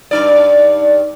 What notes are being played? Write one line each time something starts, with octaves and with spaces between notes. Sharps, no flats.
G2 D#4 D5